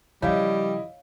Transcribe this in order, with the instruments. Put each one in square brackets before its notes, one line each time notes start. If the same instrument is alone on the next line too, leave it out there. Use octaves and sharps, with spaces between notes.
[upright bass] C#3 F3 [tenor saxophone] G3 [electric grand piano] E4 D#5 [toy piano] C#5 F5